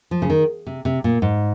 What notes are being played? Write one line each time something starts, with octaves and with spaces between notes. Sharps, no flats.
F3
C#3
D#3
C3
C3
A#2
G#2